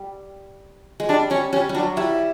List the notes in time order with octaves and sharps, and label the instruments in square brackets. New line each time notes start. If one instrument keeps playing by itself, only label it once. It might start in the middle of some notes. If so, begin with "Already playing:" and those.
Already playing: [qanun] G3
G#3
[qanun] G3 [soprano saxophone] D4
[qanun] G3 [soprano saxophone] C#4
[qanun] G3 [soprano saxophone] C#4
[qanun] G3
[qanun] F#3 [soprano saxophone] D4
[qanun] G3 [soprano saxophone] E4